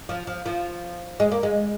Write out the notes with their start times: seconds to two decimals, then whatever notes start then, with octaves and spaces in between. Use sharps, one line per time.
0.09 F3
0.27 F3
0.46 F3
1.20 G#3
1.32 A#3
1.43 G#3